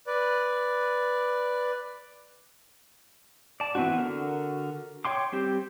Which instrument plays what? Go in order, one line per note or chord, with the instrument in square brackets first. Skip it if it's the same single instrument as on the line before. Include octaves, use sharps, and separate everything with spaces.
[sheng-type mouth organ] B4 D5
[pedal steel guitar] D5 A5
E3 B3 C4 D4 F#4
D3 F#4 A#4
C#5 G5 C6 D6
G3 C4 G4